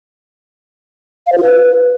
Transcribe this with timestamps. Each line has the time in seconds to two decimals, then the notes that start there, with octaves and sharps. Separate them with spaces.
1.27 F5
1.32 C5
1.38 F4
1.43 B4